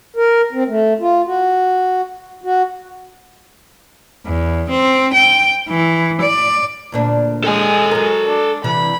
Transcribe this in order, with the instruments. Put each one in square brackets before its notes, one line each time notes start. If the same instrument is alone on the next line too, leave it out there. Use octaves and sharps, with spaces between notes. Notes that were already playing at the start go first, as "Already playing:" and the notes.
[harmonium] A#4
C4
A3
F4
F#4
F#4
[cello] E2
C4
G5
E3
D5
[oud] D2 A#2 D4
[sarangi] G#3 [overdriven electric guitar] A4 G#5
[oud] F#3 A#4
[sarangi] D4
[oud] C3 E3 G3 [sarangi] B5